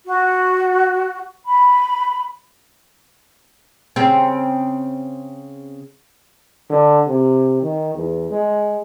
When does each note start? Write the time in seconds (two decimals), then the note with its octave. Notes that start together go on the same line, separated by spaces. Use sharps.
0.06 F#4
1.46 B5
3.96 C#3 C4
6.70 D3
7.07 C3
7.62 D#3
7.95 E2
8.31 G#3